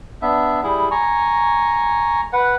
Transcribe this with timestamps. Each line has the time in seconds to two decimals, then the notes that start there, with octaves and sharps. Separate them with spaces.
0.22 B3 D4 E5
0.63 G3 E4 G#4
0.91 G#5 A#5 C#6
2.33 B4 F#5